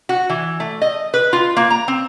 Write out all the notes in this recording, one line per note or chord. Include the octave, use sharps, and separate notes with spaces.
F#4
E3
A3
D#5
B4
F4
A#3
A#5
C4